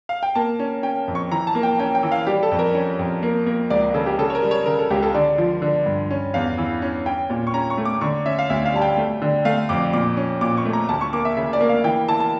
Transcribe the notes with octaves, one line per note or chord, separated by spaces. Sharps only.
F5
G5
A#3 A5
C#4
C#4 G5
F2
C#6
E3 A#5
A5
A#3
G5
C#4 G5
G5
E3
F5
G3 G4
A4
F2
A#4
C#4
F2
A#3
A#3
C#2 D5
C#3 A4
G4
C#3 A4
C#5
A#4
G3
C#5
C#3 A#4
A4
C#2 G4
A4
D3 D5
F3
D3
G2
C#4
E2 F5
E3
C#4
C#4 G5
A#2
C#6
C#4 A#5
C#6
A3
D6
D3 C#6
C#4 E5
F5
D2 E5
F5
G3 A5
G5
A3
D3
A3 F5
F2 D6
A#2 D6
C#4
A#2 D6
C#6
A3
A#5
D2 A5
C#6
A#3 D6
E5
C#3 E5
D5
A#3
F5
E3 G5
E3 A5
A5